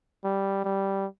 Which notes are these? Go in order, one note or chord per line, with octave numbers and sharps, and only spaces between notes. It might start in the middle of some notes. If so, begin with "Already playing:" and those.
G3
G3